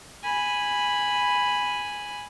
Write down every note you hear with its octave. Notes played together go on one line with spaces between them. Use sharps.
G#5 B5